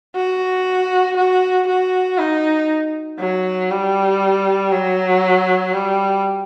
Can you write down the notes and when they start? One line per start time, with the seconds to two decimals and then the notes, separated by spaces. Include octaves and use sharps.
0.15 F#4
1.17 F#4
1.67 F#4
2.18 D#4
3.19 F#3
3.71 G3
4.72 F#3
5.73 G3